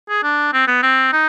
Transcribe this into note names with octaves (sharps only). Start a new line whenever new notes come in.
G#4
D4
C4
B3
C4
D#4